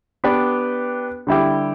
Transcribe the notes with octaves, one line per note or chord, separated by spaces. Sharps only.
B3 D4 G4 B4 D5
D3 G3 E4 G4